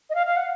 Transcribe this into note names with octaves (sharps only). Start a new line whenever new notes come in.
D#5
F5
F5
F#5